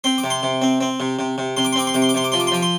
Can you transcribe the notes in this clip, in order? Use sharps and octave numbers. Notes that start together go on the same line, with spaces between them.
C4 C6
D6
C3
C6
C3
C4
C4
C3
C3
C3
C3 C6
D6
C6
C4 D6
C6
C3 D6
C6
D6
C3 C6
D6
F3 C6
D6
C6
F3 D6
C6